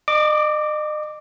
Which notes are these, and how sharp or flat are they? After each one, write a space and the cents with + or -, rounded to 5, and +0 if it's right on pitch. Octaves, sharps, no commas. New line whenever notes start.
D#5 -40 D6 +0